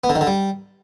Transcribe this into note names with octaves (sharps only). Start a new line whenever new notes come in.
B3
D3
D#3
D3
G3